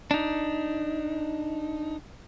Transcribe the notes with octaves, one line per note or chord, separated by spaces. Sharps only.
D4 D#4